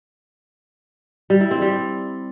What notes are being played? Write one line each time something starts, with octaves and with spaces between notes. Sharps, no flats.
G3
E4
C4
G3